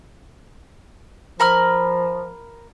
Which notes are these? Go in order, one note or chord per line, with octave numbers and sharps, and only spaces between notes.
F3 A#4 B5 F6